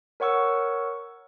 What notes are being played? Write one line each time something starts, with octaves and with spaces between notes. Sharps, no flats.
A#4 C#5 F#5 C#6 E6